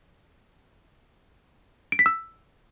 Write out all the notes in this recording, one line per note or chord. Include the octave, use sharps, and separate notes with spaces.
D7
B6
E6